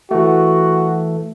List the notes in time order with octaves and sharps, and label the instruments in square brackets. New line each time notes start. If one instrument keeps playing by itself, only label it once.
[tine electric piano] E3 A3 [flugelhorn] F#4